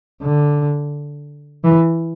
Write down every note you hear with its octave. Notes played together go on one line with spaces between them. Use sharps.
D3
E3